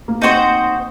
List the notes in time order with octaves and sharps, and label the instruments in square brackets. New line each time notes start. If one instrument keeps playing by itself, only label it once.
[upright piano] A#3
[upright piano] C4 [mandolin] D#4 F#4 C5